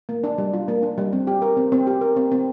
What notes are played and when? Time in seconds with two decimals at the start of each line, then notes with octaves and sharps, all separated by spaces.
0.09 A#3
0.24 D4
0.38 G3
0.53 F4
0.68 A#3
0.83 D4
0.98 G3
1.13 C4
1.27 G4
1.42 A#4
1.57 C4
1.72 C4
1.87 G4
2.01 A#4
2.16 C4
2.32 C4